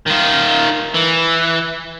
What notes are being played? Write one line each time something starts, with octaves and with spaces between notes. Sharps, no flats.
D#3 F4
E3